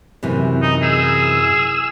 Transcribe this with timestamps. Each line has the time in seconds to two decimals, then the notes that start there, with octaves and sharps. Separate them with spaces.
0.23 F#2 C3 E3
0.62 D#4
0.82 G#4 E6